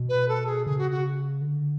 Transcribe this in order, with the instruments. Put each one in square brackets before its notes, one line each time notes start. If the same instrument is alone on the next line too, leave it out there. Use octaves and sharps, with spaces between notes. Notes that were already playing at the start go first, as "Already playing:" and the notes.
Already playing: [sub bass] B2
[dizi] B4
A4
G#4
[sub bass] C#3 [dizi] G#4
[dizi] F#4
F#4
[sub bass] D3